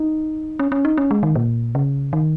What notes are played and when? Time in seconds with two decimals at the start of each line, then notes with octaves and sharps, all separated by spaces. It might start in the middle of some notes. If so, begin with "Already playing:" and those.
Already playing: D#4
0.59 C#4
0.72 C#4
0.85 D#4
0.97 C#4
1.11 G#3
1.23 D#3
1.35 A#2
1.75 C#3
2.13 D#3